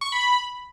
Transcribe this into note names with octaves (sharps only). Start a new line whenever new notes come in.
C#6
B5